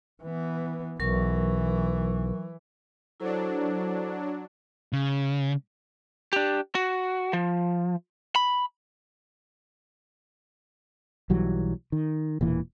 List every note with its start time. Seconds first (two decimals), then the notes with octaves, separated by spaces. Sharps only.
0.23 E3 B3
1.00 B1 E3 F#3 A#4 C#6
3.20 F#3 D4 E4 A4 C5
4.93 C#3
6.33 D4 G4
6.75 F#4
7.33 F3
8.36 B5
11.30 B1 E3 F#3 G3
11.92 D#3
12.41 E1 A#2 E3